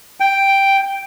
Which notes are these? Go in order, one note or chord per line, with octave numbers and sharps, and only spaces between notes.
G5